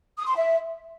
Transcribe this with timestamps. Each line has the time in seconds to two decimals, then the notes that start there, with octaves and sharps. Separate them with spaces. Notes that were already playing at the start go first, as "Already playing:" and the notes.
0.18 D#6
0.27 C6
0.36 E5